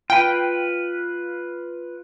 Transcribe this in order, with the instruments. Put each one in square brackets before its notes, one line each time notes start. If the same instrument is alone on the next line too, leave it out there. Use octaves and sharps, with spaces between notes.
[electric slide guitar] F4 B4 [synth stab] G5